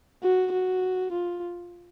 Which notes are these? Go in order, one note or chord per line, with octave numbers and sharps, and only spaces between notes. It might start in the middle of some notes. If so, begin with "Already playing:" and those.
F#4
F#4
F4